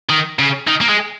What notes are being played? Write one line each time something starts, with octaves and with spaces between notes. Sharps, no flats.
D#3
C#3
D#3
A#3
G#3